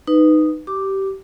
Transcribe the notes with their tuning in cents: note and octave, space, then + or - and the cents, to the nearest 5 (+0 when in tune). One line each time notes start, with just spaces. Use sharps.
D#4 -10 B4 +10
G4 -20 D6 +0